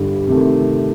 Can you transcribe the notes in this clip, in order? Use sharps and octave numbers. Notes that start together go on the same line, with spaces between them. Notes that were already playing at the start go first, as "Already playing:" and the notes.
Already playing: G1 G2 D3 G3
C3 D#3 A3